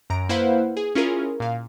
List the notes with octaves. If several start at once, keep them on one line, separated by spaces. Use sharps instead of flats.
F#2 A#5 D7
A#3 E4 B4 C5 F5 F#5
G#4
C#4 E4 F4 G#4 A#4
A#2 F5